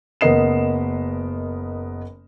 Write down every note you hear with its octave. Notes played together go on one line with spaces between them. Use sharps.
F#1 B3 A#4 D#5 C7 E7